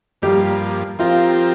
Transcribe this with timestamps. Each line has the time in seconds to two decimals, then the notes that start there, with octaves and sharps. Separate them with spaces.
0.22 G2 F3 G3 A#3 G4
0.99 F3 C4 F4 G4 A#4